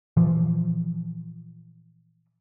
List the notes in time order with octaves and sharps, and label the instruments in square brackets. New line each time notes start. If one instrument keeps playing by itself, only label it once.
[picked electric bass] A#2 E3 F3